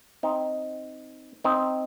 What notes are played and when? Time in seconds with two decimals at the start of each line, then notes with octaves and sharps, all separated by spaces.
0.23 C4 D#4
1.44 C4 D#4